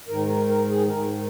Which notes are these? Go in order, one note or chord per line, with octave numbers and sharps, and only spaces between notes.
G#2 D#3 A#4
A#4
A#4
G#4
G#2 D#3 A#4